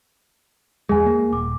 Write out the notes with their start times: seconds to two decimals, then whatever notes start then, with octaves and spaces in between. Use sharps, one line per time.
0.89 E2 G#3 G#4 G#5
1.06 A#3
1.33 D#1 D6